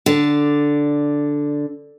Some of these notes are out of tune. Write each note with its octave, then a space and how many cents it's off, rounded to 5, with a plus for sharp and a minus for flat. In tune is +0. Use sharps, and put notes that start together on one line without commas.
D3 -5 D5 +0